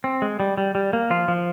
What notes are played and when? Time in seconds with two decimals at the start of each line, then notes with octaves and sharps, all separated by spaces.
0.04 C4
0.22 G#3
0.40 G3
0.58 G3
0.75 G3
0.93 A#3
1.10 F3 F4
1.28 F3